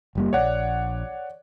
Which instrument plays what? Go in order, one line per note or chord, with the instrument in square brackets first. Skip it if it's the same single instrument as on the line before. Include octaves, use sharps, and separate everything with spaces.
[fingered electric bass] F#1 G3 A#3
[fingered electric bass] A#1 [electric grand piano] C#5 D5 F#5